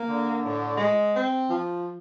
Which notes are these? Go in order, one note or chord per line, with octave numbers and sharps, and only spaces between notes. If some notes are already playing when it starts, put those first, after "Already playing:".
Already playing: A#3
D3
A2
G#3
C4
F3